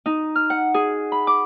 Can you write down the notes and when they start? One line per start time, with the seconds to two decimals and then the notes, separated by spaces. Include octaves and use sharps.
0.06 D#4
0.35 F6
0.50 F#5
0.74 G#4
1.12 B5
1.27 D6